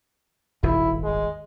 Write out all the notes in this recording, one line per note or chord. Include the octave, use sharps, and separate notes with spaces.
D#1 G#1 G2 E4
G#3